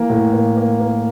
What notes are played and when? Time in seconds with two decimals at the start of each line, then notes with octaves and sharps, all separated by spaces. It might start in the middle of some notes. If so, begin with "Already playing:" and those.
Already playing: E3 A#3
0.10 A2
0.33 A#3
0.57 A#3
0.80 A#3